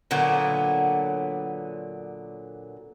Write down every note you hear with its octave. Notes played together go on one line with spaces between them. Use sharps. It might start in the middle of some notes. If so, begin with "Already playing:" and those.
A#2 D3 F#3 B3